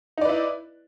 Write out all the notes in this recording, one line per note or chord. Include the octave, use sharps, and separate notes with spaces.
D#4 E4 B4 D5